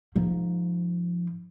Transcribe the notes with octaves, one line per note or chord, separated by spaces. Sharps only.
G#2 F3